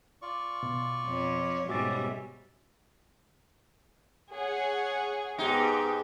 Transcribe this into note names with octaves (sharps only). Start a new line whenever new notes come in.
F4 D5 C#6
B2
F2 C#5
G#2 B2 G3 C#4 F#4 E5 D6 A6
G#4 C#5 F#5
G#2 B3 D#4 G4